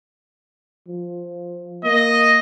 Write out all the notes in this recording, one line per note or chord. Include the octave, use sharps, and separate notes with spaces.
F3
A#3 D#5